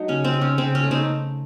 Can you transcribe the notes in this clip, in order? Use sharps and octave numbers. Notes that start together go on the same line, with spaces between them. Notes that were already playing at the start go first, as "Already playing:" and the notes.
Already playing: F#3 A3 D#4
C#3 C#4
C4
C#3
C#4
C#3 C4
C#4
A3
C4 D#4